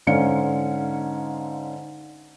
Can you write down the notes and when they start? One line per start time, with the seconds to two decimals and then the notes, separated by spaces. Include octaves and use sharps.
0.07 G#2 D3 C#4 F5 C#7